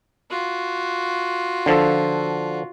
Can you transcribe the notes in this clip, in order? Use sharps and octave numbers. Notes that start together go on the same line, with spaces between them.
F4 F#4
D3 F3 A4